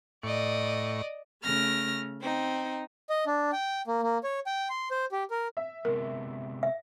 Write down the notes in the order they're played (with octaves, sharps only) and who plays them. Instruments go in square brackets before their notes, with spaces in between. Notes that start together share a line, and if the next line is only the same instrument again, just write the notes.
[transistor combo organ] A2 C#6 [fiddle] D5 D#5
[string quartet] C#3 A3 F6 A#6
C4 D#4
[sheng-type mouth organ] D#5
D4
G5
A#3
A#3
C#5
G5
C6
C5
G4
A#4
[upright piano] E5
[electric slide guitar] C3 G#3 B3 [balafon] A#4
[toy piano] E5